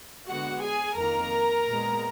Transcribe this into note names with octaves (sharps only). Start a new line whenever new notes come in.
D3 G#3 B3 F#4 F#5
G#4 G#5
F2 D#3 A#3 A#4 A#5
A#2 G#3 B3